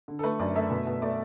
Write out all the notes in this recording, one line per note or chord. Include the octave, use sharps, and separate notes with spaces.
D3
A4
A3 B4
F#2 D5
A3 E5
B2
B2
A3 D5